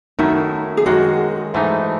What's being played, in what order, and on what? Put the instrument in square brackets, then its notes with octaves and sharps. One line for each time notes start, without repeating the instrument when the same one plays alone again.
[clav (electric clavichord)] F#2 D#3 A3 E4 [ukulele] D#4
[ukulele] G#4
[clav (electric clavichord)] F#2 D#3 G#3 [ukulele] F#4
[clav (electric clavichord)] G#2 E3 A3 D#4